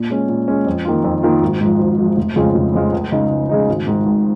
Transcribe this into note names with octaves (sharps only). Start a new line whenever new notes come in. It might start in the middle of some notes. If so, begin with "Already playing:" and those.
Already playing: A#2
G#3 C#4
A#2
G#3 C#4
F2
D#3 A#3 F4
F2
D#3 A#3 F4
G#1
G#2 F3
G#1
G#2 F3
F1
F2 C#3 G#3 F4
F1
F2 C#3 G#3 F4
C#2
C#3 G#3 D#4
C#2
C#3 G#3 D#4
G#1
G#2 D#3
G#1